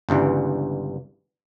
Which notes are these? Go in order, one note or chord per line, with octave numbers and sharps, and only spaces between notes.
G1 C#2 G2 E3